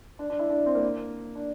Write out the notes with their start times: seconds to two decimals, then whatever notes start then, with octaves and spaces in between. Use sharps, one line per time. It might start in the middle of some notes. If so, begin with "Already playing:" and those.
0.19 D4
0.30 D4
0.39 E4
0.50 D4
0.66 C4
0.75 A#3
1.35 D4